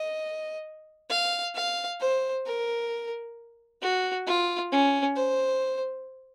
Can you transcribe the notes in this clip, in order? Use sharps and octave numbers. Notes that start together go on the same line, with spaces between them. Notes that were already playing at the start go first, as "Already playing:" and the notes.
Already playing: D#5
F5
F5
C5
A#4
F#4
F4
C#4
C5